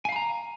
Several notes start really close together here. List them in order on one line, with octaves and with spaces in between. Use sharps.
G#5 F5 B5 A#5